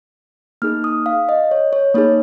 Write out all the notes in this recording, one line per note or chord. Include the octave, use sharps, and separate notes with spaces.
A#3 D#4 G#4 F6
D#6
F5
D#5
C#5
C#5
A#3 D#4 G#4 C#5